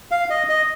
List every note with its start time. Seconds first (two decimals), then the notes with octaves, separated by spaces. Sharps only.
0.11 F5
0.30 D#5
0.49 D#5